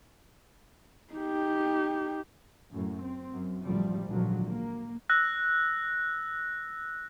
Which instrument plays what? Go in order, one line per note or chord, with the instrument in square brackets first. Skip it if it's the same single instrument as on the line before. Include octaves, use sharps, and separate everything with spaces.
[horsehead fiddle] D#4 G4
[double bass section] F#2 A2
C4
F#2
A1 D2 F3 G3
G#1 C#2 A#2 D3 F3 F#3
A#3
[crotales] E6 F#6 A#6